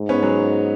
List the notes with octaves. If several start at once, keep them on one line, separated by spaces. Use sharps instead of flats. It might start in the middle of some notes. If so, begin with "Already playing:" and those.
Already playing: G#2
B3 C#4
F#3 G#3